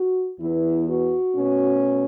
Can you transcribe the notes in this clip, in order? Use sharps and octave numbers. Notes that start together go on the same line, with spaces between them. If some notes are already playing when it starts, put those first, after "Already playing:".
Already playing: F#4
E2 E3 B3 E4
F#4
B2 A3 C#4